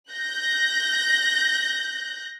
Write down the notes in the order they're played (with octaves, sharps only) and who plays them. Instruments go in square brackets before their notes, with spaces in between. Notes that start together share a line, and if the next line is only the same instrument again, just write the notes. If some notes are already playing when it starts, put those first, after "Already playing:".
[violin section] F#6 G6 A#6